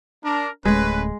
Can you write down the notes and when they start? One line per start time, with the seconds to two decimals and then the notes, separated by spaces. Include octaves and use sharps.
0.24 D4 A#4
0.65 D1 G#3 A3 C#4 B4